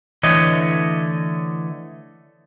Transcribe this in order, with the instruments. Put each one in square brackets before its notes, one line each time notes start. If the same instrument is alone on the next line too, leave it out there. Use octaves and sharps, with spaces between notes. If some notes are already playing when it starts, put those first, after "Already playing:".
[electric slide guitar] D3 E3 A3 C#5 D#5